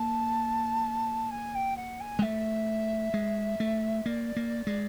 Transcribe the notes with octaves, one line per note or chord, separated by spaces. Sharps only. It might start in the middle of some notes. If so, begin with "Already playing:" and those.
Already playing: A#3 A5
G#5
G5
F#5
G#5
G#3
A3 E5
G#3
A3
A#3 D5
A#3
G#3